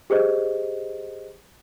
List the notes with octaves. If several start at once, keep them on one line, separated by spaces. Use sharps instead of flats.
G4 G#4 C5 D#5